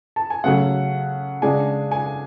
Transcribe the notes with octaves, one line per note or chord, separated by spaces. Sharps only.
A5
G#5
C#3 F#3 A3 C#4 F#5
C#3 G#3 D4 G#5
G#5